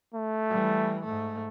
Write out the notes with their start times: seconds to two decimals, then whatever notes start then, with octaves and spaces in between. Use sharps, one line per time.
0.15 A3
0.49 E3 G3
1.04 G#2 A3